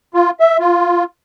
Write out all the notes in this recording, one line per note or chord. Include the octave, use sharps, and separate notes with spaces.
F4
E5
F4